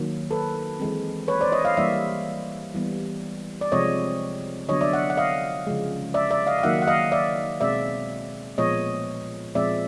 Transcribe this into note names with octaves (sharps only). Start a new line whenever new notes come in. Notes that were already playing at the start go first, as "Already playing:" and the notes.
Already playing: D#3 F#3 A#3
A4 B4
E3 G#3 C4
B4 C#5
C5 D5
C#5 D#5
D#5 F5
E3 G3 A#3 D5 E5
E3 G3 B3
D5
C3 F3 G#3 C4 C#5 D#5
D3 F#3 B3 C#5 D#5
D5 E5
E5 F#5
F#5
D#5 F5
C#3 F3 G#3
D5 E5
D5 E5
D#5 F5
F5
D#3 F#3 A#3 E5 F#5
F#5
D#5 F5
D5 E5
B2 G#3 C4 D5 E5
A#2 F3 G#3 B3 C#5 D#5
A#2 F3 G#3 C4 D5 E5